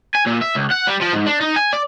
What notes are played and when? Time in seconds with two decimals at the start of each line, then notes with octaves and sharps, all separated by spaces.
0.15 G#5
0.26 A#2
0.41 E5
0.55 C#2
0.71 F#5
0.87 G3
1.01 F3
1.13 G#2
1.26 D4
1.41 D#4
1.56 G#5
1.73 D5